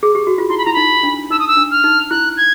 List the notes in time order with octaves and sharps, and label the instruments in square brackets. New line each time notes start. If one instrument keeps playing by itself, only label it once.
[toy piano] G#4
G4
F#4
F4
[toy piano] E4 [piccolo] C6
[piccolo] B5
[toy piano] E4 [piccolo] A#5
[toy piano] D#4 [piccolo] B5
[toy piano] D4
[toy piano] D#4 [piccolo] E6
[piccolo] D#6
E6
[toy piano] D4
[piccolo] F6
[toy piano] D#4
[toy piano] E4 [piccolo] F#6
[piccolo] G#6